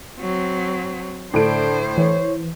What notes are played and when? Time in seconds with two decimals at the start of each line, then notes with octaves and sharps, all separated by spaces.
0.18 F#3 C4
1.34 A2 D3 D4 C5 D7
1.97 E3 C#5